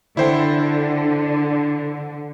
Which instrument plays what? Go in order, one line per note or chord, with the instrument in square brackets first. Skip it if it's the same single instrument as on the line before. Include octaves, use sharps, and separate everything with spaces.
[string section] D3 [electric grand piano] E4 C5 G5